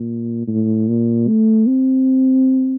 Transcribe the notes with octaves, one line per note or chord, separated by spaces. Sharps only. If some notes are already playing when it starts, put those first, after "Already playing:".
Already playing: A#2
A2
A#2
A3
C4